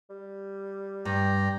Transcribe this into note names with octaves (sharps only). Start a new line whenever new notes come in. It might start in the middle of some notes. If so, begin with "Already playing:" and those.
G3
G2 D5 G5 A#5